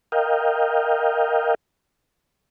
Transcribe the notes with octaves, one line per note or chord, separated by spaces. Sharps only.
A#4 D#5 F5 G5